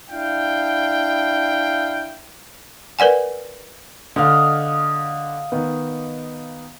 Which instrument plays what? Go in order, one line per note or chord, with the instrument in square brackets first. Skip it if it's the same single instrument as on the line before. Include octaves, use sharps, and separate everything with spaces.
[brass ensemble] D4 E4 F5 G5
[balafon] A#4 B4 D5 F#5 G#5
[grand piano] D3 [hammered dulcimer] D#5 F5
[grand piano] D#3 B3